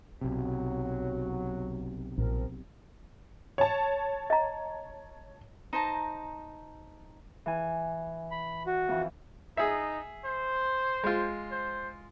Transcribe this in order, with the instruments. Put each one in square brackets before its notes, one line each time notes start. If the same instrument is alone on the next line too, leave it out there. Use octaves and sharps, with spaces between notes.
[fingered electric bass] B1 C3 [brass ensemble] F#3
[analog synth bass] A#1 [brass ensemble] F3 C4 A#4
[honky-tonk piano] C#5 A5
[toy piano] D#5 A#5
[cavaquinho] D#4 C5 A5 A#5
[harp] E3 G#5
[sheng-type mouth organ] B5
F#4
[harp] F2 E3
[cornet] D#4 [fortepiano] G#4 E5
[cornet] C5
[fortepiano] G#3 F4
[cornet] C5